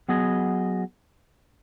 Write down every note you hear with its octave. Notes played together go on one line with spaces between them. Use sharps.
F#3 B3 G#4 D#5